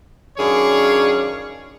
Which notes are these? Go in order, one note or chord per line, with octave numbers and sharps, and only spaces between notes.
F#2 D#3 D4 G#4 C#5 F5